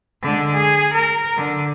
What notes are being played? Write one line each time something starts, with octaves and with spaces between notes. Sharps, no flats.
D3 G#3
G#4
A#4
D3